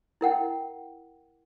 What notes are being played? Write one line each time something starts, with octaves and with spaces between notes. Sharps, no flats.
E4 A#4 F#5 G5